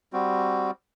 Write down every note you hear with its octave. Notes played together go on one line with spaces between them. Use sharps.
G3 C4 F#4